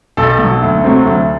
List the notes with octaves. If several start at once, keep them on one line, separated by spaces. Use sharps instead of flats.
B1 A4
B2
F#3
D2
C3 F#3 A3 C4
D2